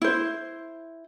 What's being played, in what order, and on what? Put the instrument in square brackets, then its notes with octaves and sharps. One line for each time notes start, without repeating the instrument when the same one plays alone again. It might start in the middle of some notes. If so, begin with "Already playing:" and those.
[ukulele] E4 C5